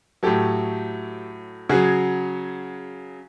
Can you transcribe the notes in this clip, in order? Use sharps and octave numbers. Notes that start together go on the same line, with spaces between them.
A2 F#3 G4 A4
C#3 F#3 F#4 G#4